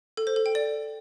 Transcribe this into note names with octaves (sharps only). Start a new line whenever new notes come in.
A4
C5
A4
G5
D5